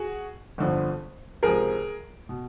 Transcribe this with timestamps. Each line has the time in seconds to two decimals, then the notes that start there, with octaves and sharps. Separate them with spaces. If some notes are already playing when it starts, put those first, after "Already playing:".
Already playing: F#4 G#4
0.58 G1 F2 D3 F3
1.43 C#2 C3 F3 G#4 A#4
2.29 B2